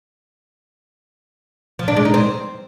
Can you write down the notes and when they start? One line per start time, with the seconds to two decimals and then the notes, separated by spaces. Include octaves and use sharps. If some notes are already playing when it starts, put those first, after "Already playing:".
1.79 F3
1.88 D4
1.97 G#3
2.05 D#4
2.14 C4